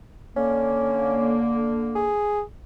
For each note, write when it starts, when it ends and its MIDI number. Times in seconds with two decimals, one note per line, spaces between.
0.36 2.14 50
0.36 2.14 58
0.36 1.43 61
1.95 2.42 68